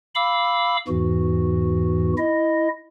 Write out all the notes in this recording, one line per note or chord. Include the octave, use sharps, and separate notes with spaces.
F5 B5 D6 E6
E2 G#2 E3 F#4
E4 D#5